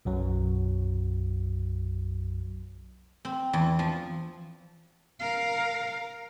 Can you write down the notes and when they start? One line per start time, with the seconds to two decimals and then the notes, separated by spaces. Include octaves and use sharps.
0.05 B1 F#2 F#3
3.25 C4
3.53 E2
3.79 F3
5.20 A#4 F5